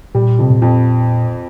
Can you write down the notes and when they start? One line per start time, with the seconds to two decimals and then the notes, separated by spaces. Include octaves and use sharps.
0.15 A#2 G3
0.39 F2 C3
0.50 A#2
0.62 F2